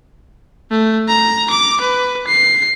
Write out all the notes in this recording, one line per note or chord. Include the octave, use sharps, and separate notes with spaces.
A3
A#5
D6
B4
C7